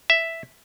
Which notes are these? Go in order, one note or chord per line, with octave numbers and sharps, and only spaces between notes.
E5